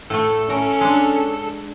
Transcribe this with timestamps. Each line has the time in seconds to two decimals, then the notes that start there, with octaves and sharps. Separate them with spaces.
0.10 A2 A3 A4
0.50 C#4 A#4
0.81 G#3 D4